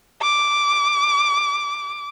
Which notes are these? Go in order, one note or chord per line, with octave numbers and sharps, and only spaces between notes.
D6